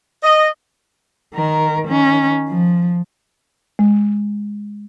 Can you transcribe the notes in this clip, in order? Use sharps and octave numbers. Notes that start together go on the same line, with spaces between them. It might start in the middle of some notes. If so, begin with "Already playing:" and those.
D#5
D#3 A#4
D#3 C#4
F3
G#3